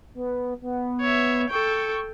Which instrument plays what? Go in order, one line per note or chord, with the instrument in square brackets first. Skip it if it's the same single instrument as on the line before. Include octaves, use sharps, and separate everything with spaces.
[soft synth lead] B3
B3
[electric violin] C#5 E5
[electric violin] A4 G5 [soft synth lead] C#6